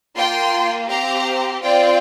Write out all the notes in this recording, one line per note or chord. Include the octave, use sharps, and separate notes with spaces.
A#3 F4 G5 C6
C4 G4 F5 A#5
C4 F4 D5 G5